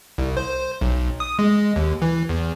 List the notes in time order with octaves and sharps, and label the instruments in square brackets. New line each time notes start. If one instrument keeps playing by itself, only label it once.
[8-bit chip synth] C2
C5
B1
D#6
G#3
D#2
E3
E2